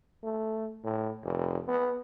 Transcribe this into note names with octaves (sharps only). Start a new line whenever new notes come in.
A3
A2
F1
B3